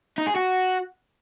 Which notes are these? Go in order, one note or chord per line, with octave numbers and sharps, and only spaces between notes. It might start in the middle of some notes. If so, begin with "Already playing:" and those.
D#4
G#4
F#4